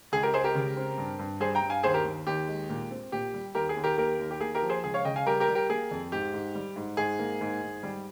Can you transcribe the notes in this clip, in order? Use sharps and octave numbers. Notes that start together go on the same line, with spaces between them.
C#2 G#4
G4 A#4
G#3 G#4 C5
G4 A#4
C#3
C4
G2
G2
G3 G#4 C5
G5 A#5
G2
F5 G#5
D#2 G#4 C5
G4 A#4
D#2
D#2 G4
G#3
A#2
C4
A#2 G4
G3
D#2 G4 A#4
G#4
D#2
G4 A#4
A#3 G4 A#4
D#2
G4
A#3 G#4
G4 A#4
F3
G#4 C5
C#2 G#4
C#5 F5
C#3 D#5 G5
F5 G#5
G3 G4 A#4
G4 A#4
G3
G4 A#4
A#3 G#4
F2
G#2 G4
G#2
G3
G#2
G#2 G#4
A#3
G#2
G#2
G3